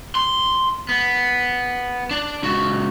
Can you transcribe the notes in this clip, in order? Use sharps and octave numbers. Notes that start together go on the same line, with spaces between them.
C6
B3
D4
C#2 F#4